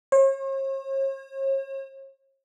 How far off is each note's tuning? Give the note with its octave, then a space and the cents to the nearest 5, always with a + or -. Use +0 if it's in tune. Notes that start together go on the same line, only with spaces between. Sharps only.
C#5 -45